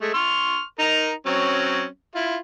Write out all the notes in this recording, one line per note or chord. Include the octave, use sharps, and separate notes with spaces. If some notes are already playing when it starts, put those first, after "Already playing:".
G#3 A3
C6 C#6 F6
D#4 A#4 A#5
F#3 C4 C#4
E4 F4